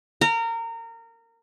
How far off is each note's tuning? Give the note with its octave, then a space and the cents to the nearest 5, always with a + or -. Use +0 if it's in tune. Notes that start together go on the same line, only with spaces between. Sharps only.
A#4 -25